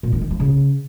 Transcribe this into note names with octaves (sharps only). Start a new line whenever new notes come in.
A#2
D3
D#3
F3
C#3